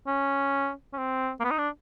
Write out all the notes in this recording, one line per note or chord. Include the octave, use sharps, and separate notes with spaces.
C#4
C#4
C4
A#3
B3
D#4
D4